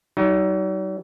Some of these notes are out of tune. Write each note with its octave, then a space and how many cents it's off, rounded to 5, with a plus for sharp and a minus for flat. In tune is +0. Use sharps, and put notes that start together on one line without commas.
F#3 +45 D#4 +20